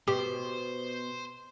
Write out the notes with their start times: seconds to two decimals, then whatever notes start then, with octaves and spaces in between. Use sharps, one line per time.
0.08 B2 G4 C5